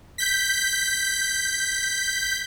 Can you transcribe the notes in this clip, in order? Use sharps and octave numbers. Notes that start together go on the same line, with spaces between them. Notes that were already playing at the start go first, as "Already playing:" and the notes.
G6 B6